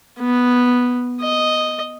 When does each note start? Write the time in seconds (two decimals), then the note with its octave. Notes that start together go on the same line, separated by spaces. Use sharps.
0.19 B3
1.21 D#5